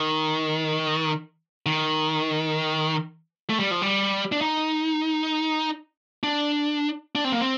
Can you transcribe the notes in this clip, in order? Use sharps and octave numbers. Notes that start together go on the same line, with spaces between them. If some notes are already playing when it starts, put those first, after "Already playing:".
Already playing: D#3
D#3
A3
G3
F3
G3
D4
D#4
D4
D4
C4
A#3
C4